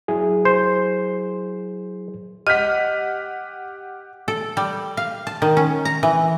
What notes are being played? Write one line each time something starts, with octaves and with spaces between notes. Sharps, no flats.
F#3 E4 G#4
C5
G4 D#5 F#5 F6 G6 B6
A4
G3
F5
A5
D#3
C#4
A#5
E3